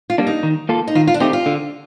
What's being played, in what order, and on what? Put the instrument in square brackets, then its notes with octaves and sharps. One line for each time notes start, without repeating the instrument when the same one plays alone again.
[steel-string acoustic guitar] F4
[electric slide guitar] G3 A#3 D4
[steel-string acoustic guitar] D#4
[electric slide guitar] D#3
A#3 F4 A4
[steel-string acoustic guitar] D#4
[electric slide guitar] D#3 [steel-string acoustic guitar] F4
[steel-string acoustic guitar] F4
D4
[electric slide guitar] A3 C4 G4 [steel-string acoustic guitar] D#4
[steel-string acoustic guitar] F4
[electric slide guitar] D3